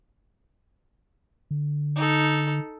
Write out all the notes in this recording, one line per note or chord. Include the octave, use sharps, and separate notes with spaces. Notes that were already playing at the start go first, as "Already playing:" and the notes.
D3
D#4 A4